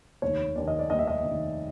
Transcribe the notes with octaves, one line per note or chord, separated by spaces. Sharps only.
F1 D#2 D#3 C#5
F1 D#2 D#3 D5
D#5
D5
F1 D#2 D#3 D#5
E5
D#5
F1 D#2 D#3